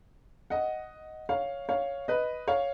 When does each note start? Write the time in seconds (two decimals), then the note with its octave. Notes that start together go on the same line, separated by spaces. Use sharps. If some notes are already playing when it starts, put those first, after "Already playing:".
0.50 D#5 F#5
1.29 C#5 F5
1.69 C#5 F5
2.08 B4 D#5
2.48 C#5 F5